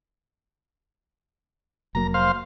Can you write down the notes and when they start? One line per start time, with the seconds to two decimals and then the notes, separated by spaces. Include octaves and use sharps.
1.95 F1 F#3 A#3 A#5
2.14 C5 F5